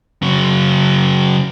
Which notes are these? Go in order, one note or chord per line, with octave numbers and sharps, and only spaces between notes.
C#3 F#3